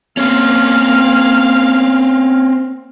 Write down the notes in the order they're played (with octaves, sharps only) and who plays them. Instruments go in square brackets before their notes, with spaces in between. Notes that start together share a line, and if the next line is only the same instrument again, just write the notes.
[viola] A#3 F5 [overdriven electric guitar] C4 C#4